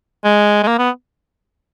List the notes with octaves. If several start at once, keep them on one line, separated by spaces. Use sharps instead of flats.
G#3
G#3
A#3
B3